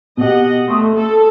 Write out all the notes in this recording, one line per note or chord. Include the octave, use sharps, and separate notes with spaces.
B2 G4 D#5 F#5
A3 C6 C#6 D#6
A4